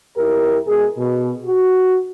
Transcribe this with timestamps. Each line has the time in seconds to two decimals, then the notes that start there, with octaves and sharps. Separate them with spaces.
0.17 F2 E4 G4 A#4
0.67 B2 G#3 G#4
0.98 B2
1.46 F#4